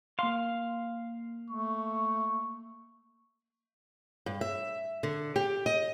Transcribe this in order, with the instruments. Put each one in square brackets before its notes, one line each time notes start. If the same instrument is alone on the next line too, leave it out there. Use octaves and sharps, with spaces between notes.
[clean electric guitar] A#3 C6 [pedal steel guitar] F5
[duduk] A3 [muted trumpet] C#6
[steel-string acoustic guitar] G2
E5
D3
G4
D#5